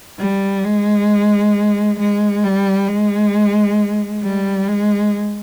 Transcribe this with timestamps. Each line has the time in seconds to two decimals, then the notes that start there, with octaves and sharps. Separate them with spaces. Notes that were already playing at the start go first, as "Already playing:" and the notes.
0.19 G3
0.64 G#3
1.99 G#3
2.44 G3
2.88 G#3
4.23 G3
4.68 G#3